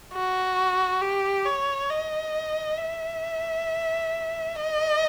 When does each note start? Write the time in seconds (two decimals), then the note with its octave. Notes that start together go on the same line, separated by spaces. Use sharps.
0.14 F#4
1.02 G4
1.46 C#5
1.90 D#5
2.78 E5
4.55 D#5